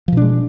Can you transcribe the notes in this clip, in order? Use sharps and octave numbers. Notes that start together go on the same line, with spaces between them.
B2 F3 G#3 D4